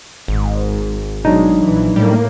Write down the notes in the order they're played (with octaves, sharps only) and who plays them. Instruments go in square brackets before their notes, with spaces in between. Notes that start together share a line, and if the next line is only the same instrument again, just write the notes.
[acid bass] G#1 [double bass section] G#2
[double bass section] B2 G#3 [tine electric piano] F#3 D4 D#4
[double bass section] A#1 E3
[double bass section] A2 A#3 [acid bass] G3